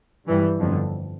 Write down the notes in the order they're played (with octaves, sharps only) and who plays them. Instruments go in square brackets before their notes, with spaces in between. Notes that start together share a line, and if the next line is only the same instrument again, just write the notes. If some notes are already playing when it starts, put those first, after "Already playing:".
[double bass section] G2 E3 G3
G1 F2 D3